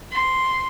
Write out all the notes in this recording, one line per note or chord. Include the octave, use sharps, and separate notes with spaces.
C6